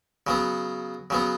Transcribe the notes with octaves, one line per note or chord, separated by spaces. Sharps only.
C#3 F#3 B3
C#3 F#3 B3